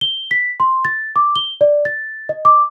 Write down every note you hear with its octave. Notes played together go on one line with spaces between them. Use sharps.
G7
B6
C6
A6
D6
G7
D5
A6
D#5
D6